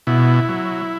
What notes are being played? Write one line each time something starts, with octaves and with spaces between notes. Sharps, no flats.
B2 E4
F#3